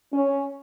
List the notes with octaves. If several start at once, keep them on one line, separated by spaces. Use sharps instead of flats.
C#4